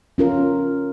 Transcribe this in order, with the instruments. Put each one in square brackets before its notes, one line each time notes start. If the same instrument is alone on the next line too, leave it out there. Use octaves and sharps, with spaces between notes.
[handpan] C#4 F4 A#4